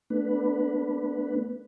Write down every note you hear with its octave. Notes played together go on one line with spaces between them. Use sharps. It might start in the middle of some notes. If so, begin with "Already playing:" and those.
A3 B3 D4 B4